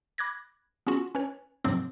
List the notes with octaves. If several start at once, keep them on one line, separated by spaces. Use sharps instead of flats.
B5 D6 F#6 G#6 A#6
B3 C#4 F4 F#4 G#4
C#4 B4 C#5
G#2 C3 F3 F#3 A#3 C4